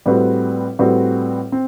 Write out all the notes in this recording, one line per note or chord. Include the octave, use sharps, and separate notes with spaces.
A2 G3 C4 F#4 B4
A2 G3 C4 F#4 B4
C4